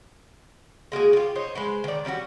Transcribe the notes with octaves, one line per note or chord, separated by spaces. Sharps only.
G#3 A#3 F#4 G#4
F4 G4
D#4 C5 C#5
G#3 B4 C5
D#3 D5
G3 C#4 E4 F#4